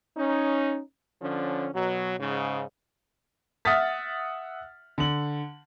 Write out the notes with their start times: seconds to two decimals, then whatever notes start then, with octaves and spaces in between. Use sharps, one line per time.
0.16 C#4 D#4
1.21 D3 F3 C#4
1.74 B2 F#3
2.19 G#2 C#3
3.65 E5 F#5 D#6 F6 A6 B6
4.98 D3 F#7